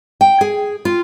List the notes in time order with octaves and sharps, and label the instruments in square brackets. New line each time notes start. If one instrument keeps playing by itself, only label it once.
[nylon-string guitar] G5
G#4
F4